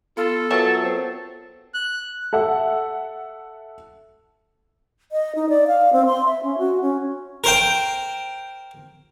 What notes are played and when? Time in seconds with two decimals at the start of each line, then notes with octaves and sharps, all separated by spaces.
0.17 B3 F4 A4
0.51 F#3 F4 A#4 B4 E5 A5
0.84 C4
1.74 F#6
2.33 A4 E5 F#5
5.12 D#5
5.35 D#4
5.49 D5
5.67 F5
5.93 C4
6.06 C6
6.26 E5
6.43 C#4
6.58 F#4
6.82 C#4
7.44 A#4 C5 G5